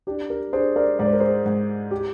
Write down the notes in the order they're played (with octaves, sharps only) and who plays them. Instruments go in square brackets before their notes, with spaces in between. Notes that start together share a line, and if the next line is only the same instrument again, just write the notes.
[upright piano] D4 [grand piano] G4
[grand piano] G4 A#4
[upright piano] D4 [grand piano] G#4 C5
[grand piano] A#4 D5
[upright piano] G#2 [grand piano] D5
[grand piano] C5
A#4
G#4 C5
[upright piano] G#2
[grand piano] G4